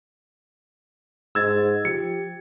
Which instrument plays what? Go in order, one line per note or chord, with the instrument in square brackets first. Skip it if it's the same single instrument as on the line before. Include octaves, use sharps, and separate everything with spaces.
[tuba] G#2 [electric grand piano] E6 G#6 A6
[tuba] F3 [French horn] G4 [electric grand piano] C#7